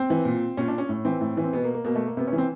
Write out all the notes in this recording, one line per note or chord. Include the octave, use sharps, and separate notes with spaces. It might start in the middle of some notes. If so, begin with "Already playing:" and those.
Already playing: C4
E3
A#2
A#2 C#4
D4
C#4
A2
E3 C4
A2
E3
C4
B2 B3
A#3
A#3
B2 A#3
A3
A#3
C3 B3
C#4
E3
C4